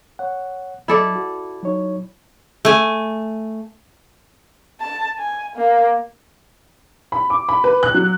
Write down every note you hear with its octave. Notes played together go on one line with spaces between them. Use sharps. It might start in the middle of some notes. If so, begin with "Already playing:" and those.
C#5 F#5
F#3 E4 A4 D5
F#4
F#3 D#4 C#5
A3 G#5
A5
G#5
A#3
B5
D6
B5
B4
F#6
F#3